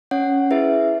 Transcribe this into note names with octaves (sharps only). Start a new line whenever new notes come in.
C#4 C#5 F#5
E4 G#4 B4 E5